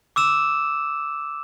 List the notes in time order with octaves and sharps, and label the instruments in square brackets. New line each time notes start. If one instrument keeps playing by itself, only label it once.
[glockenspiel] D6 E6 E7